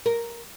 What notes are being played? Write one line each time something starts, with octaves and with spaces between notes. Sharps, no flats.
A#4